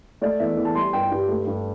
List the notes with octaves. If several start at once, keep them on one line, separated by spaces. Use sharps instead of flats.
A3 D5
E2 E5
E2
A5
G3 C6
G2 G5
G2 G4
A3
G2